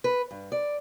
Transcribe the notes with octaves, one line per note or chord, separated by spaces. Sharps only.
B4
G2
D5